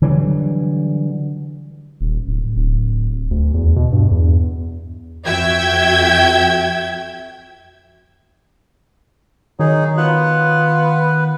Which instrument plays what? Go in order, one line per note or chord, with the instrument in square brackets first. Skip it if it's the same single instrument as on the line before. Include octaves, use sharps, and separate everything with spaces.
[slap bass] D3 E3 F#3 G3
[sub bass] D#1
D1
D1
D2
E2
B2
G2
E2
[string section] F2 F#4 E5 G5 G#6
[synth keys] D#3 [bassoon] F#3 [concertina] D#4 G#4
[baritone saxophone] B3 [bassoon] F4 [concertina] B4